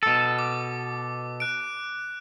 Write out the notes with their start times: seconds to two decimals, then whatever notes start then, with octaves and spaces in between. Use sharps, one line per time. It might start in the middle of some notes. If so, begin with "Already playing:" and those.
0.03 B2 A4
0.39 D6
1.40 F#6 D7